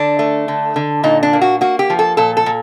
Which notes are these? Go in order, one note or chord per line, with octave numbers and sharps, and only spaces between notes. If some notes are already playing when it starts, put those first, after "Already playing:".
Already playing: D3 D4
A3
D3
D3
A#2 D#4
D4
A#3
F#4
A#3 F#4
G4
F3
A4
A#2 A4
A4
A#2